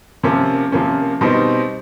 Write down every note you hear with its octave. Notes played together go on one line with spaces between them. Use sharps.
C3 F3 A#3 C#4
C3 F3 A#3 C#4
B2 G3 C4 D#4